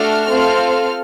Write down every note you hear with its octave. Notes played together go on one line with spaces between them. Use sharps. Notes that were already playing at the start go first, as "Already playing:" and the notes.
Already playing: A3 D4 F#4 A4 F6
C4 F4 A4